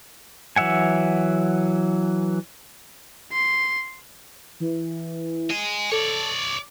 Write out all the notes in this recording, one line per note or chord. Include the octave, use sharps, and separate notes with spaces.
E3 F#3 E5 F#5 G#5
C6
E3
D#5 G#5
A4 C#5 D5
D6